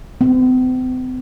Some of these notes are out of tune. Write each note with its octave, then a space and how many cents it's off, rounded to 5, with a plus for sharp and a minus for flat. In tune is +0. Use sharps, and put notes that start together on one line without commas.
C4 -45